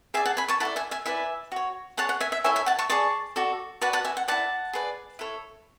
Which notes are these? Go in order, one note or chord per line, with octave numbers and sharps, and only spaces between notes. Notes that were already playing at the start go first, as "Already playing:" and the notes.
G#4 D5 E5 G#5
F#5 A5
G#5 B5
A5 C#6
E4 A4 D5 F#5 A5
E5 G#5
E5 G#5
E4 B4 D5 E5 G#5
F#4 C#5
G#4 C#5 F#5 A5
F#5
E5 G#5
E5
E4 A4 C#5 E5 G#5
E5 G#5
F#5 A5
A5 C#6
G#4 D5 A5 C#6
F#4 A4 D5
F#4 B4 D5 F#5 A5
F#5 A5
E5 G#5
F#5
E4 B4 D5 F#5 A5
G#4 B4 D5
E4 A4 C#5